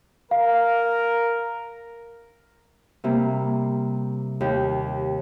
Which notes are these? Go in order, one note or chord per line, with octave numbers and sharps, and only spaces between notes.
A#4 F5
C3 G3 A#3
D#2 G4